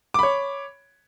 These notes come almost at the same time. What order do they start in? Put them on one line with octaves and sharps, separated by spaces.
D6 B5 C#5